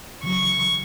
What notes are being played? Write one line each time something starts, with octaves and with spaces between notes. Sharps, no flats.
C#3 E3 F#3 C#6